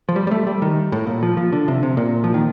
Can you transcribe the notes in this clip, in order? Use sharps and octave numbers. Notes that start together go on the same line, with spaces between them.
F3
G3
G3
A3
G3
D#3
A2
A#2
F3
F3
D3
C3
C3
A#2
F3
D#3